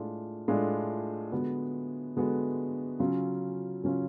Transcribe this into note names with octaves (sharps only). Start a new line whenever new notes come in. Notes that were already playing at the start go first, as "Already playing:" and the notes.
Already playing: A2 G#3 D4 F4
A2 G#3 D4 F4
D3 G#3 B3 F#4
D3 G#3 B3 F#4
C#3 F#3 C#4 F4
C#3 F#3 C#4 F4